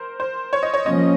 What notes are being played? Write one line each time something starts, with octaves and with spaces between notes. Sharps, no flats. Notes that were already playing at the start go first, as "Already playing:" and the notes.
Already playing: A#4 C5
C5
C#5
D#5
C#5
F3 A#3 C#4 D#5